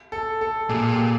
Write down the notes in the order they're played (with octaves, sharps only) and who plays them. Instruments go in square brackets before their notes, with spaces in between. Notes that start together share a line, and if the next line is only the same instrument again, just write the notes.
[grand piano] A4
A4
[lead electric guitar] A#2 [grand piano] G#4
[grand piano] G4